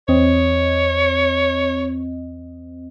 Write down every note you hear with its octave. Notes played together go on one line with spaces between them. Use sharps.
E2 C4 C#5 D#5